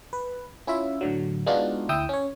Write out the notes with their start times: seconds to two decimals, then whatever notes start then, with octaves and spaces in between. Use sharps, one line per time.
0.13 B4
0.67 C#4 E4 F4 E5
1.01 A2 D3 F#3
1.46 G#3 B3 D4 D#4 F4 F#4
1.89 D2 E4 G5 D#6 E6
2.09 C#4 C#5